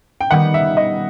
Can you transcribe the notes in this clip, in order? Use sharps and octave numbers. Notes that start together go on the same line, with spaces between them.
G5
D#3 G3 B3 F#5
E5
D#5